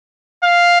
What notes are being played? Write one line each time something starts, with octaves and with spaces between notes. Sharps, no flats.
F5